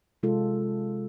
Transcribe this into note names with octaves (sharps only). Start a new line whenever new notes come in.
C3 G#3 F4 A4